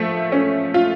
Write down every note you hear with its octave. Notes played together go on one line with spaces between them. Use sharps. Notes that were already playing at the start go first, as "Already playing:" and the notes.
Already playing: F3 A3
C#4
F4